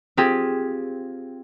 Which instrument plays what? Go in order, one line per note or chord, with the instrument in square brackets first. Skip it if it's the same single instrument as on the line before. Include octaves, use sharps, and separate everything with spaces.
[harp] C4 F4 G4 G#4